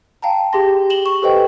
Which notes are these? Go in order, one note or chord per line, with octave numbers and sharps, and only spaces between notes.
F5 G5 A5 A#5
G4 G#4 G5 C6 A#6
E7 F#7 G7
C#6
G4 A4 B4 C5 D#5 G5